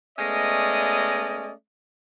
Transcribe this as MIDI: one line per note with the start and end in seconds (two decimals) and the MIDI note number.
0.18 1.51 56
0.18 1.51 57
0.18 1.51 59
0.18 1.51 61
0.18 1.51 74
0.18 1.51 75